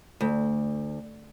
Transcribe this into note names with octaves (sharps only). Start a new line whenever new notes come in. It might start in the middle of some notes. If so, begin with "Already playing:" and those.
D2